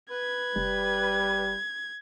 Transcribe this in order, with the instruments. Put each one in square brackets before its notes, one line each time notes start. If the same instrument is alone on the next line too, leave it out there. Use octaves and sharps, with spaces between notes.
[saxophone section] B4 [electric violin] G#6
[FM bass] F1 [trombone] G3